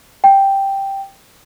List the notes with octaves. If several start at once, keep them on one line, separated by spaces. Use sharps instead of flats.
G5